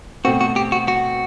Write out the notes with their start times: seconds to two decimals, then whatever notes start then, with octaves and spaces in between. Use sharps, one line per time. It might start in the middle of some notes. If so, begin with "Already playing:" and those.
0.24 B2 A3 C4 F#4
0.41 F#4
0.56 G4
0.72 F#4
0.88 F#4